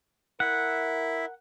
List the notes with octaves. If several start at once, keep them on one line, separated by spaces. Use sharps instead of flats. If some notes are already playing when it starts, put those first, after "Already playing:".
E4 A#4 E5 F#5